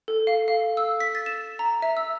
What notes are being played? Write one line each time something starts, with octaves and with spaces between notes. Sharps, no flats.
A4
F5
F5
E6
B6
A6
E7
A#5
E5
E6